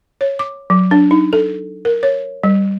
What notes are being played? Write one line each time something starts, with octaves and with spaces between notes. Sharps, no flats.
C#5
D6
F#3
D4
D#4
A4
A#4
C#5
G3